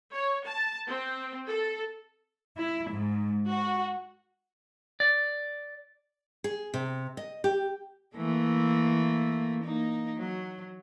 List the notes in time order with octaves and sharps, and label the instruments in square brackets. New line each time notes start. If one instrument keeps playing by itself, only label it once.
[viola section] C#5
A5
C4
A4
[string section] E4
G#2
F#4
[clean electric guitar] D5
[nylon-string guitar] G#4
C3
D#5
G4
[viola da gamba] E3 A3 A#3
A#3 D#4
F#3